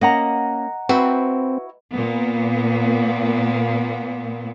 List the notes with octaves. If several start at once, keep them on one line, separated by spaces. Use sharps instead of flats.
A#3 C#4 D#5 F#5 A#5
C4 E4 F#4 B4 B5
A#2 A#3 B3